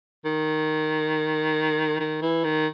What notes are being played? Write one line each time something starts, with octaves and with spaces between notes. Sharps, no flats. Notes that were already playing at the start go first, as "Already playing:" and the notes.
D#3
D#3
E3
D#3